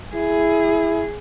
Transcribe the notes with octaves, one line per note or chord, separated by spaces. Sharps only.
E4 G#4